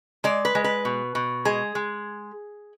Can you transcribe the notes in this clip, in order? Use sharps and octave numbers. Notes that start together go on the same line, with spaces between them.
G#3 D5
B4
G#3
B4
B2
B2
G#3 G#4
G#3